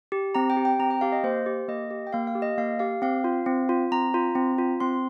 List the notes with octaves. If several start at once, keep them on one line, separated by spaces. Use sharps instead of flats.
G4
C4 A#5
G5
G4
G5
C4 A#5
G5
G4 F5
D#5
A#3 C5
G4
A#3 D#5
G4
G5
A#3 F5
F5
G4
D#5
A#3 F5
G4 F5
C4 F5
F4
C4
F4
C4 A#5
F4
C4
F4
C4 C6